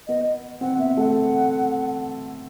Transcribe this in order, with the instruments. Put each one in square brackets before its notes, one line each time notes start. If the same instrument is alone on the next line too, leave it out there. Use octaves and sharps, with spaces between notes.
[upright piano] B3 [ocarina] D#5
[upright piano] C4 [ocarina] F#5
[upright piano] B3 [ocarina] E5
[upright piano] A3 [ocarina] F#5